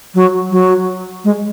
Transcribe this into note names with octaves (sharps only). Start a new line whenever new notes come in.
F#3
F#3
G#3